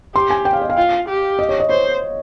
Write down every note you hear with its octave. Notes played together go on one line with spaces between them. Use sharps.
G4 C6
G#5
G5
F5
D#5
F5
F4
G4
D#5
C#5
D#5
C5 C#5